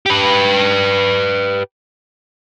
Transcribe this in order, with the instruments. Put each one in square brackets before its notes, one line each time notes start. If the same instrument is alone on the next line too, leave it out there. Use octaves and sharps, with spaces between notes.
[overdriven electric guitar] G4 B4